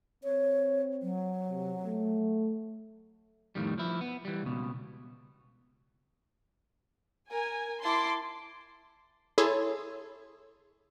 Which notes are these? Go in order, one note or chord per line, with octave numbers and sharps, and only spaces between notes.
C4 C#5
F#3
C3
A3
F2 A2 D#3 G3
F3 E4
B3
E3 G3
C#2 B2
A#4 G#5
E4 A5 C6 D6 C7
E4 G#4 A4 C#5 C6